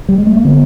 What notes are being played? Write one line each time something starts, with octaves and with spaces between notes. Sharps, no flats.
G3
G#3
A3
A#3
D3 B3